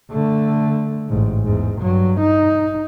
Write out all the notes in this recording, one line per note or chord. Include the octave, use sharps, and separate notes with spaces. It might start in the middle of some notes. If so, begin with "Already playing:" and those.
D3 A3
A1 G#2
E2 G#2
G2 F#3
D#4